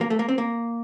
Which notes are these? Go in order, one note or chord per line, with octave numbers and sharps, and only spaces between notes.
A#3
A3
A#3
C4
A#3